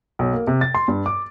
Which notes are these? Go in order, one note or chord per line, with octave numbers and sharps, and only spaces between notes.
B1
A#3
C3
A6
C6
G2
D6